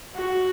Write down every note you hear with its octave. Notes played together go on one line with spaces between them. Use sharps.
F#4